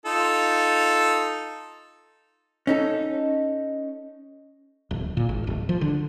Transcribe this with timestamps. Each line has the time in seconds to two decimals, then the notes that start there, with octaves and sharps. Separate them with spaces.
0.06 D#4 F4 A4
2.67 C#4 D#4 A4
4.91 D1
5.17 A#2
5.29 G#1
5.47 D1
5.69 F3
5.81 D3